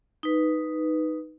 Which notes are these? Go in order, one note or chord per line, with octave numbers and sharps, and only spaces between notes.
D#4 B4